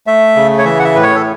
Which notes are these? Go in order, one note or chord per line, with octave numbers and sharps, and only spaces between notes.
A3 E5
C#3
C#5
E3 E5
F#5
E5
A2 B4
C#5
A4